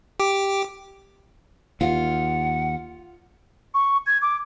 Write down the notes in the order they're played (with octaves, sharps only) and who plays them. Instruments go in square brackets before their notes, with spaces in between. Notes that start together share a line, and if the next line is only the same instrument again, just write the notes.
[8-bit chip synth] G4 D6
[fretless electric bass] D#2 [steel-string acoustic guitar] F4 [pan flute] F#5
[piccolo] C#6
G#6
D6